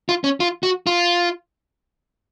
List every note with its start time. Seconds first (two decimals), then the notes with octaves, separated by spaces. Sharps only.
0.09 F4
0.24 C#4
0.40 F4
0.63 F#4
0.87 F4